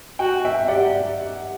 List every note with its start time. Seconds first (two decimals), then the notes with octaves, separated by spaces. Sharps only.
0.19 F#4 G5
0.45 E5 G5
0.68 G4 D5 F#5